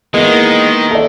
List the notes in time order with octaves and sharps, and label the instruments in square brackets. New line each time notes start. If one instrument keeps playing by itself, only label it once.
[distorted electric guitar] D#3 [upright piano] E3 A#3 B3 [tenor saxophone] G#3
[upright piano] A4 D5